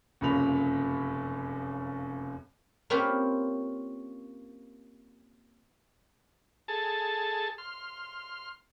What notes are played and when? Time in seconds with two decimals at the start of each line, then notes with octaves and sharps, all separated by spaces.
0.21 F1 F#2 A#2 C#3 B5 F7
2.90 A#3 C4 C#4 F4 G4 B4
6.68 G#4 A4 A5
7.58 C6 F6